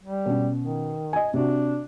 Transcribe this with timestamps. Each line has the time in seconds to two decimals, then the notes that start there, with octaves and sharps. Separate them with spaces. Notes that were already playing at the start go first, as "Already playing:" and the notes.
0.04 G3
0.26 B2 C#4
0.62 D#3
1.13 D#5 G#5
1.34 C3 D4 F#4